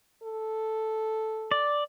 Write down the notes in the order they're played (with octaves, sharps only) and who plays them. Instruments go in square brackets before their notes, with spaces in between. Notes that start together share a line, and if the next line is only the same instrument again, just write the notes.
[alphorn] A4
[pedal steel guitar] D5